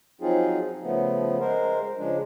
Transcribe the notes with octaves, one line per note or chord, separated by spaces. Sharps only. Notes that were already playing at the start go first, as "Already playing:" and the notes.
F3 F#3 C4 D#4 F4 G#4
C#3 F3 A3 B3
G#3 A#4 C5
C#3 F3 G#3 D4